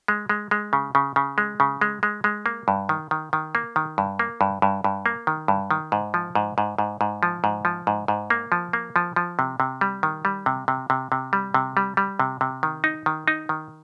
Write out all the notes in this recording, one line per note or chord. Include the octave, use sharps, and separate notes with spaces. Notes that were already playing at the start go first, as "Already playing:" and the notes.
G#3
G#3
G#3
C#3
C#3
C#3
G#3
C#3
G#3
G#3
G#3
A#3
G2
D#3
D#3
D#3
A#3
D#3
G2
A#3
G2
G2
G2
A#3
D#3
G2
D#3
G#2
F3
G#2
G#2
G#2
G#2
F3
G#2
F3
G#2
G#2
A#3
F3
A#3
F3
F3
C3
C3
G3
D#3
G3
C3
C3
C3
C3
G3
C3
G3
G3
C3
C3
D#3
D#4
D#3
D#4
D#3